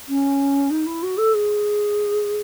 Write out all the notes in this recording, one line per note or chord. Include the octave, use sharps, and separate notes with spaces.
C#4
D#4
E4
F#4
A4
G#4